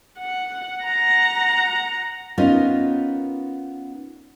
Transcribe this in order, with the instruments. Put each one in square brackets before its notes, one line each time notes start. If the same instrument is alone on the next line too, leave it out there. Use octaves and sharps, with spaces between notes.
[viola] F#5
F#5 A#5
[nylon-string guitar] B3 C#4 D#4 F4 A#4